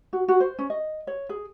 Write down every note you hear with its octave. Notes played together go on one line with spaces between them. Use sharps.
F#4
F#4
C5
C#4
D#5
C#5
G#4